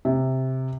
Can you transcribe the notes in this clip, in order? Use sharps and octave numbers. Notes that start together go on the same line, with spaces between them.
C3